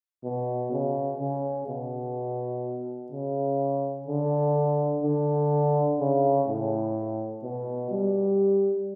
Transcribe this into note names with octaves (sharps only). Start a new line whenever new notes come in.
B2
C#3
C#3
B2
C#3
D3
D3
C#3
A2
B2
G3